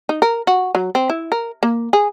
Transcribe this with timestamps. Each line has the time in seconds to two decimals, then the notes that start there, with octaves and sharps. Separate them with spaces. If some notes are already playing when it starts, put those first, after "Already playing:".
0.09 D#4
0.22 A#4
0.47 F#4
0.75 F#3
0.95 C4
1.10 E4
1.32 A#4
1.63 A#3
1.93 G#4